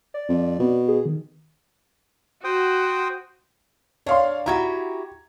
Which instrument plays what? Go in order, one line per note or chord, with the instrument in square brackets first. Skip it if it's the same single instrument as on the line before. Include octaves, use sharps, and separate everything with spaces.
[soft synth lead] D5
[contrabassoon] F2
B2
[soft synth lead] G#4
D#3
[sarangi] F#4 [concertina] C5 G5 D#6
[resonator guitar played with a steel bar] D4 [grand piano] C#5 F5 C6
[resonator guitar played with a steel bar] E4 F#4 G4 [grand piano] A#5 G#6